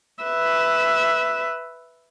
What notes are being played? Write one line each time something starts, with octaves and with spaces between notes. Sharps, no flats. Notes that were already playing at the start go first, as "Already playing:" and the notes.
B4 E5